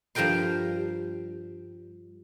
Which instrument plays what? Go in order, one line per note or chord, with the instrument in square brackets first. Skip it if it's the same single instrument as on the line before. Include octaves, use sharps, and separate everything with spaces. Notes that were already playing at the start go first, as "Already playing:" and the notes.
[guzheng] G2 F3 G3 A#4 G5 C6